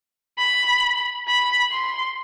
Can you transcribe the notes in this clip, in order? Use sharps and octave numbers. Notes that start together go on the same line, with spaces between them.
B5
B5
C6